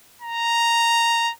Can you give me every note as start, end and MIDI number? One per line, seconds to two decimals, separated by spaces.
0.22 1.32 82